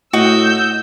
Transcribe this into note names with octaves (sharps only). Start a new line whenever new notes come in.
A2 F#4 D#5 E6 G6